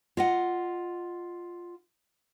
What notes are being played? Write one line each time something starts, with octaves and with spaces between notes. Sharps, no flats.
F4 D#5 F#5